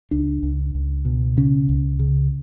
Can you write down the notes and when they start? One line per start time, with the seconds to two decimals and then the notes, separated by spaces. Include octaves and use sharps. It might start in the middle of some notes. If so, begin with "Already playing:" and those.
0.11 C#2 D4
0.43 C#2
0.75 C#2
1.05 B2
1.37 C#3 C#4
1.69 C#2
1.99 C#3